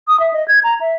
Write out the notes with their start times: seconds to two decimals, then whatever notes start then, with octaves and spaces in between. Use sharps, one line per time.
0.08 D#6
0.20 E5
0.33 D#5
0.48 G#6
0.64 A#5
0.81 E5